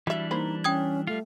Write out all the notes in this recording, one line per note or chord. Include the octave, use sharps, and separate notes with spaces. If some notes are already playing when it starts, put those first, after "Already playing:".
E3 F#3 G3 D4 E5
A#3 D#4 C5 B5
C#4 G5 D#6 G#6
G3 A3 F4